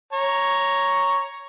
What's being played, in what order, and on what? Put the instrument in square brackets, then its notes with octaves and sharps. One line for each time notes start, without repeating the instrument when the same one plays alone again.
[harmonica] C#5 A#5